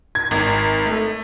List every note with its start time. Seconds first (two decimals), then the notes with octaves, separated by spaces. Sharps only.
0.15 G#6
0.31 G#1
0.86 A3